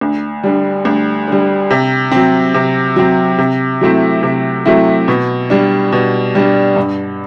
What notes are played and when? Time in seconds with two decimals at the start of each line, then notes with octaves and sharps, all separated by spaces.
0.01 D2
0.44 D3 G3
0.85 D2
1.28 D3 G3
1.70 C3
2.11 F#3 C4
2.54 C3
2.96 F#3 C4
3.38 C3
3.81 F#3 A3 C4 E4
4.23 C3
4.65 F#3 A3 C4 E4
5.08 B2
5.50 G3 D4
5.92 B2
6.35 G3 D4
6.76 G2